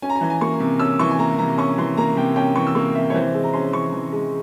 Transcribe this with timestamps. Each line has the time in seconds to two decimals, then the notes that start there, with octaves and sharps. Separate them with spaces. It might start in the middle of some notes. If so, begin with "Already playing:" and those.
0.02 C#4 G#5
0.10 A#5
0.16 G#5
0.21 E3 A#5
0.30 G#5
0.41 A#3 C#6
0.60 C3
0.80 C#4 E6
0.99 E3 C#6
1.10 G#5
1.19 A#3 A#5
1.38 C3 A#5
1.58 C#4 C#6
1.78 E3 C6
1.97 A#3 A#5
2.17 C3 G5
2.36 C#4 G5
2.55 E3 C#6
2.67 E6
2.75 A#3 C#6
2.95 C3 E5
3.10 C#5
3.14 E3 C5
3.34 G#3
3.44 A#5
3.53 C#4 C6
3.73 E3 C#6
3.92 E3
4.12 G#3